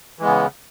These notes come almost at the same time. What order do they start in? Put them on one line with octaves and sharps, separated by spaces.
E3 G#3 B3 C#3